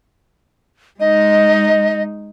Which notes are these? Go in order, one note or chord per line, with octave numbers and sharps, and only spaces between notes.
G#3 D#4 D#5